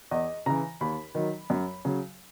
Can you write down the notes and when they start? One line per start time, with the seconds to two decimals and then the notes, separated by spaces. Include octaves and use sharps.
0.11 E2 D#5
0.46 C#3 E3 A#5
0.81 D#2 B5
1.15 D#3 F#3
1.50 F#2
1.85 C#3 F#3